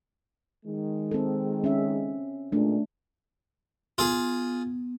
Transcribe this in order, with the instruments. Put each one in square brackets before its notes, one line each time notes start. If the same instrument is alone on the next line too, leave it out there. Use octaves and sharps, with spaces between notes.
[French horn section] D#3 G#3
[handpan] C4 A4
C#4 E5
[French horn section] A#2 G#3 [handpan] A3 D4
[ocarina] B3 [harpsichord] F4 G#4